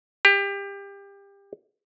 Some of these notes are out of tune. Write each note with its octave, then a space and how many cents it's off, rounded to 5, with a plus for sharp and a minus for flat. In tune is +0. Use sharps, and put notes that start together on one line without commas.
G4 +25